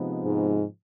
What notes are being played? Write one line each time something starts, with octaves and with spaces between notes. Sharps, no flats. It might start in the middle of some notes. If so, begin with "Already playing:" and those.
Already playing: C3 F3 G#3 B3 D#4
G#2